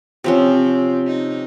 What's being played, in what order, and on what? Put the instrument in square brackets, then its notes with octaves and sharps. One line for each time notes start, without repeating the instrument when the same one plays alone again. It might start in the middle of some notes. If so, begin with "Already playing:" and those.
[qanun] C3 F3 C#4 [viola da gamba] C4
[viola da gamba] D#4